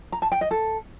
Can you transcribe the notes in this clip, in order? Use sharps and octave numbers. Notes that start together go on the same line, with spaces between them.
A#5
A5
G5
D#5
A4